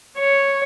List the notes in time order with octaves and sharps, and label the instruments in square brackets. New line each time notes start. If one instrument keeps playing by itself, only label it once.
[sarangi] C#5